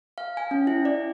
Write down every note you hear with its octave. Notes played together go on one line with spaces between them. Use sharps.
F5
G#5
C#4
E4
D5